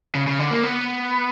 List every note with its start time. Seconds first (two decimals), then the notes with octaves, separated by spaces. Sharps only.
0.15 C#3
0.27 C#3
0.39 D3
0.51 A#3
0.63 B3